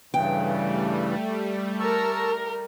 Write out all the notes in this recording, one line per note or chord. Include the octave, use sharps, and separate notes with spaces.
G2 C#3 E3 G3 A3 G5
A#4 A5 C#6 E6